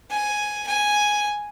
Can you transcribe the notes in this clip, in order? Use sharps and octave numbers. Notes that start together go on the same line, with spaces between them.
G#5
G#5